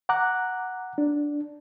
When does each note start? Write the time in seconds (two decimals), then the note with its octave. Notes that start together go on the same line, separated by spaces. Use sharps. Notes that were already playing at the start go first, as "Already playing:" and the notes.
0.09 F#5 A#5 D6 F#6
0.98 D4